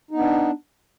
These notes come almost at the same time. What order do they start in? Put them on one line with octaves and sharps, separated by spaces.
D#4 B3 D4